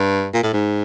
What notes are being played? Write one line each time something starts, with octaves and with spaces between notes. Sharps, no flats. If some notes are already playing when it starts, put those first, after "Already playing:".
Already playing: G2
A#2
A2
G#2